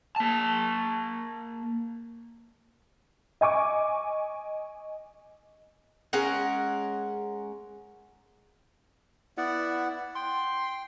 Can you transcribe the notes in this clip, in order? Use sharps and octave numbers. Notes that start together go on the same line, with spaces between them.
A#3 A5
D#5 G#5 C#6 D6
G#3 C#4 A#4 F#5
B3 E4 D5 F#5
G5 C6